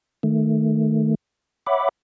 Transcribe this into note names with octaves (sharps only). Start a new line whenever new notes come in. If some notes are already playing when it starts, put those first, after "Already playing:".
D#3 A3
C#5 E5 F#5 B5 D6